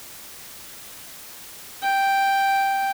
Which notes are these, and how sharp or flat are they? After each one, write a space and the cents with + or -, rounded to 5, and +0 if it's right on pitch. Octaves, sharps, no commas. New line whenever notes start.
G5 +0